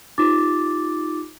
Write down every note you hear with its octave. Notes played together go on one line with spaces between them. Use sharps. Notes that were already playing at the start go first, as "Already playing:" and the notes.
D#4 F4 G4 D6 A6